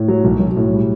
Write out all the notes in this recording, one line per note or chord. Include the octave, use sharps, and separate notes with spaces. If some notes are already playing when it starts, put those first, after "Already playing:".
Already playing: A2
F#3
B1
B1
A2
G3